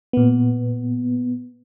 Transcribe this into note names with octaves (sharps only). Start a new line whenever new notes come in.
A#2 B3